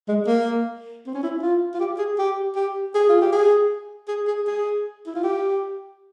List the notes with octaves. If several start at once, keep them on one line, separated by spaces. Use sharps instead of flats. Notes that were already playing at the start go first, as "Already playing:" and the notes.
G#3
A#3
C4
C#4
E4
F4
F4
G4
G#4
G4
G4
G#4
F4
G4
G#4
G#4
G#4
G#4
E4
F4
G4